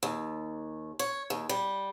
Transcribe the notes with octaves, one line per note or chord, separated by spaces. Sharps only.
D#2
C#5
D#2
G3